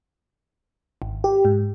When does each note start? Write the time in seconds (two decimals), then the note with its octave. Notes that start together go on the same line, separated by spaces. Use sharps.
1.02 G#1
1.24 G4
1.45 G#2